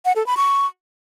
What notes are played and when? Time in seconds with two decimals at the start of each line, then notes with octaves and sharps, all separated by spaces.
0.05 F#5
0.16 A4
0.26 B5
0.37 C#6